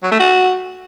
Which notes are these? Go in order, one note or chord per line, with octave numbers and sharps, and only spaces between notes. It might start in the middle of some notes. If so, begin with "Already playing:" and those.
F#3
A3
F#4